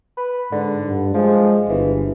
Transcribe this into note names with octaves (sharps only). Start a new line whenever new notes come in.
B4
G#2 D3
G2
F3 G#3
G1 E3